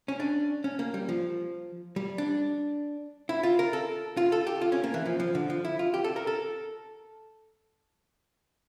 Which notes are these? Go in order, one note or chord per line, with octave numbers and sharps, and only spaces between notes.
C#4
D4
C#4
A#3
G3
F3
G3
D4
E4
F4
A#4
A4
F4
A4
G4
F4
C#4
A#3
E3
F3
F3
D3
F3
E4
F4
G4
A4
A#4
A4